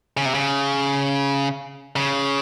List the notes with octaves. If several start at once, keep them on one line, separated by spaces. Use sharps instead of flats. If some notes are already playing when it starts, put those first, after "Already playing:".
C#3
C3
C#3
C#3